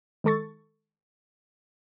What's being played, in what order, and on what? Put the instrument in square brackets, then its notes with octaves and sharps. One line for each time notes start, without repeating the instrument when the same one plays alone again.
[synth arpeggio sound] D#3 G#3 A4 C#6 A6